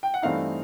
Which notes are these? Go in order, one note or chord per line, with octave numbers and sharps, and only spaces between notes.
G5
F#5
G2 E3 A3 C4 D#4 F5